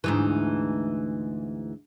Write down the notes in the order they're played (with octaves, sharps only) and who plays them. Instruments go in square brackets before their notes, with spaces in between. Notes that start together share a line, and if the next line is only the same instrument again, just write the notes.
[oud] D2 G#2 E3